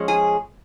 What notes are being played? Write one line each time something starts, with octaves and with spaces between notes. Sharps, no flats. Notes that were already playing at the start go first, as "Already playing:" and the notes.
Already playing: F3 G#3 C#4
G#4